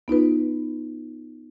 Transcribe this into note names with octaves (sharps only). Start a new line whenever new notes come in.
B3 D#4 F4 B4